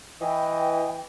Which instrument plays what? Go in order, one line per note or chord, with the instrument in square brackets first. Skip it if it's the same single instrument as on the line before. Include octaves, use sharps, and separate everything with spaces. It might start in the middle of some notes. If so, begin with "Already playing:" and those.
[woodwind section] E3 [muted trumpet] D#5 [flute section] G5